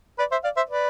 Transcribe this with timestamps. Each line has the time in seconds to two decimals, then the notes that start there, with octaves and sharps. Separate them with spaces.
0.19 B4 D5
0.31 C5 E5
0.44 D5 F5
0.56 C5 E5
0.69 B4 D5